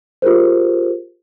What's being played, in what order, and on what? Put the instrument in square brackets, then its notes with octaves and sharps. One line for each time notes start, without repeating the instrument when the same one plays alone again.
[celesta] F4 G4 G#4 A#4 C5